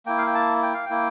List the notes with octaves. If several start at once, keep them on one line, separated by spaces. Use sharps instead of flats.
A#3 E4 G5
F5
G5
A5
G5
F5
A#3 E4 G5